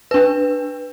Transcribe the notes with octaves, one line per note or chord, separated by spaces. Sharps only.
D4 B4